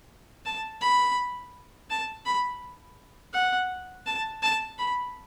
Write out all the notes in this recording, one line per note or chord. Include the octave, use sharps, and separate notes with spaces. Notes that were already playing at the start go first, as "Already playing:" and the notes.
A5
B5
A5
B5
F#5
A5
A5
B5